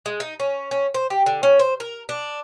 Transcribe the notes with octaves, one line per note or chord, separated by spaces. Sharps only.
G#3
D#4
C#4
C#4
C5
G4
D3
C#4
C5
A#4
D4